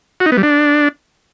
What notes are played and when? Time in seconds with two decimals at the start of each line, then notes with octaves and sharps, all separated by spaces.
0.20 F#4
0.26 D#4
0.32 B3
0.37 G3
0.43 D4